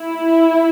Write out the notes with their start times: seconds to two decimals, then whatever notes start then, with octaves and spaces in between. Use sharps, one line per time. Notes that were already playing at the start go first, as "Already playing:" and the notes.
Already playing: E4